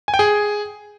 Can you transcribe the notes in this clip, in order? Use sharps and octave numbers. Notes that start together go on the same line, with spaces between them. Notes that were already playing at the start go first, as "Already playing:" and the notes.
G#5
G5
G#4